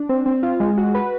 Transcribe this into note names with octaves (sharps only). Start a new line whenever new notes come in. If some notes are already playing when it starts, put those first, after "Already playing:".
Already playing: D4
C4
C4
F4
G#3
F#4
B4